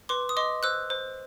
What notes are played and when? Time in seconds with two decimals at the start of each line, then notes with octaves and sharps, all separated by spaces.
0.09 B4 C6 D6
0.29 D#6
0.37 D#5 C6 D6
0.63 C5 E6 F#6
0.90 C5